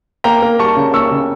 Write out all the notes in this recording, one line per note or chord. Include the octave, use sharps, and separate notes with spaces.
A#3 G5 A#5
A#3
G3 A5 C#6
C#3
A#3 C#6 E6
C#3